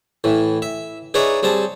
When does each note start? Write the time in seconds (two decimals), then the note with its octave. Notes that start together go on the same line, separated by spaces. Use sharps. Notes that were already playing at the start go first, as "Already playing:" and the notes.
0.24 A2 E3
0.62 E5
1.14 D#4 G#4 B4 C#5 D5 E5
1.43 G3 C4 G#4 A5